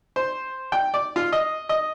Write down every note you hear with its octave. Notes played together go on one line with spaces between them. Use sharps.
C5
G5
D5
F4
D#5
D#5